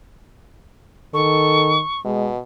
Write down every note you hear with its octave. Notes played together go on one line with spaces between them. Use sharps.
D#3 A4 C#6
B2 G#3